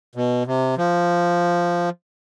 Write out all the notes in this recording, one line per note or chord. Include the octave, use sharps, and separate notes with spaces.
B2
C3
F3